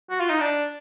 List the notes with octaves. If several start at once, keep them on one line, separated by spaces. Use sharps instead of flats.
F#4
F4
D#4
D4